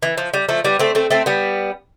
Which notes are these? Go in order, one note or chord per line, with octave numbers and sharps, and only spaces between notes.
E3
F3
G3
F3 A3
G3 B3
A3 C4
A3 C4
A3 C4
G3 B3